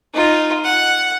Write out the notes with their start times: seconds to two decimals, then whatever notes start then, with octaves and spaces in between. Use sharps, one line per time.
0.14 D#4 F4
0.64 F#5